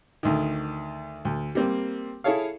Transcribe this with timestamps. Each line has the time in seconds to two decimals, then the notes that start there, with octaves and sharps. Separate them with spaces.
0.23 D2 D#3
1.25 D2
1.55 G3 A#3 C4
2.24 E4 G#4 A4 C#5 F5